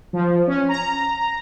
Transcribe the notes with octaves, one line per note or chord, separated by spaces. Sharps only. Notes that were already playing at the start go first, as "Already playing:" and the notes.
F3
C#4
A#5